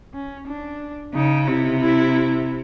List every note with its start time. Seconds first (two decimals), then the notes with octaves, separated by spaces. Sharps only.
0.14 C#4
0.47 D4
1.14 C#3 D#4
1.47 C3 E4
1.80 E4